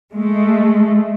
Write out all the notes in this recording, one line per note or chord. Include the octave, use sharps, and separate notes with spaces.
G#3 A3